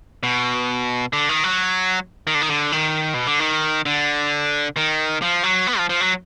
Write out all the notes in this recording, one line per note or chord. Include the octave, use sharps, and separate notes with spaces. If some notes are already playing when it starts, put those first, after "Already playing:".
B2
D3
D#3
F#3
D#3
D3
D#3
D3
D#3
B2
D3
D#3
D3
D#3
F3
F#3
B3
F3
F3
F#3